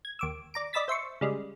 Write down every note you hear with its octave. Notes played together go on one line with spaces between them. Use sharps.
G#6
D#2 D6 E6
D5 A#5 D7
D5 D#5 B5 E6 A6 B6
C5 E5 C6 C#6
C#3 G3 G#3